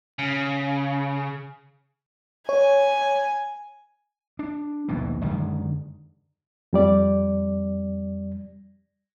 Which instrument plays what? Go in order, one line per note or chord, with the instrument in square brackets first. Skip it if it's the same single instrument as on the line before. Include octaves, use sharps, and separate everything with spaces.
[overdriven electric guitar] C#3
[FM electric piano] C#5 [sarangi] G#5
[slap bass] D4
A#1 D#2 B2 E3
F#2 D3 D#3 G#3
[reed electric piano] F2 G3 D5